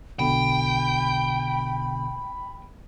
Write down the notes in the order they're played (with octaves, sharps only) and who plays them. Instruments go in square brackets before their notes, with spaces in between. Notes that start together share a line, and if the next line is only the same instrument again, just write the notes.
[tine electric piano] B1 B2 D3 [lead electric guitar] G5 [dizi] B5